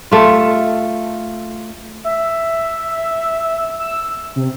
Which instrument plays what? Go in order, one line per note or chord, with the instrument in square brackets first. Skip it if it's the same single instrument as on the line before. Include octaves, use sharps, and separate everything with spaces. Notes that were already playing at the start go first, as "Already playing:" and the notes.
[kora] A3 F4
[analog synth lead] E5
E6
C3